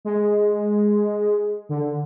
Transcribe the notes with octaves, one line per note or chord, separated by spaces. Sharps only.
G#3
D3